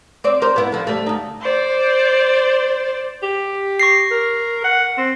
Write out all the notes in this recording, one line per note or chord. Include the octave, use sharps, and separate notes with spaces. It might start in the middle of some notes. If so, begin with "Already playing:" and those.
C4 D5
A#4 C5
B3 E4
D3 F3
G3 A3
D2 D#4
C5 D5
G4
C#6 A#6 C7
A#4
F#5
C4